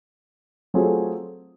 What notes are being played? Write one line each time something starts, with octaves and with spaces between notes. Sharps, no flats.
F#3 A3 C4 F4 G#4